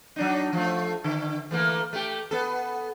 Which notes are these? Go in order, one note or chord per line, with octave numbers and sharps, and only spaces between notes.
F#3 D4 D#4
F3 A3
D3
E3 A3 A#3
A3 G4
B3 A4